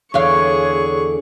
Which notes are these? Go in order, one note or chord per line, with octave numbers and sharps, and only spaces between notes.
E2 D3 G#4 C#5 F5 C#6